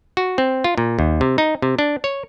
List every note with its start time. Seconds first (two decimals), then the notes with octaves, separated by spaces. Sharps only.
0.17 F#4
0.38 C4
0.64 F4
0.78 A#2
0.99 D#2
1.21 C3
1.38 D#4
1.62 C3
1.79 D4
2.04 C#5